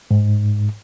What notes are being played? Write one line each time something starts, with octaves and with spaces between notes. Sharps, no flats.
G#2